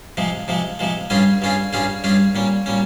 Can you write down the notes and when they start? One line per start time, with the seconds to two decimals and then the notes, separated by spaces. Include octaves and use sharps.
0.17 C3 F3 G#3
0.48 C3 F3 G#3
0.79 C3 F3 G#3
1.10 G2 G3 C#4 F4 G#4
1.42 G2 G3 C#4 F4 G#4
1.73 G2 G3 C#4 F4 G#4
2.04 G2 G3 C#4 F4 G#4
2.35 A#2 G3 C#4
2.66 A#2 G3 C#4